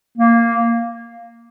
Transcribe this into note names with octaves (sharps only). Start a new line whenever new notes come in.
A#3